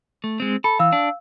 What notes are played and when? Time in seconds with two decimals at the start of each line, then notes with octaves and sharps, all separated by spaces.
0.24 A3
0.40 G#3 C4
0.64 A4 B5
0.79 E3 F5 E6
0.93 D4